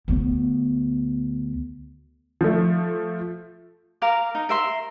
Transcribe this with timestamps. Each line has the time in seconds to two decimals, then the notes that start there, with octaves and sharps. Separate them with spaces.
0.08 D2 B3
2.41 F3 A3
4.02 A#4 F5 D6
4.35 D#4
4.49 A#4 E5 C6